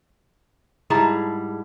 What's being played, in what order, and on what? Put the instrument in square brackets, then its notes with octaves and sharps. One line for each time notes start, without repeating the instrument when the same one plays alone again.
[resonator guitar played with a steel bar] G#2 G3 E4 G#4 A5 A#5